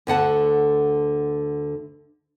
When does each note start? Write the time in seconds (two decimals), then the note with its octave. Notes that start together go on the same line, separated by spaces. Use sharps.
0.07 D2 D3 F#5 A5